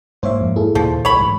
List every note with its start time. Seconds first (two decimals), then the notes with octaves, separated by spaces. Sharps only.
0.23 G#2 A#3 C5 C#5 E5
0.41 F2
0.56 E4 G#4 A4
0.75 D#2 A#2 C#3 F3
1.05 C2 C#5 B5
1.16 D2 G#2 E3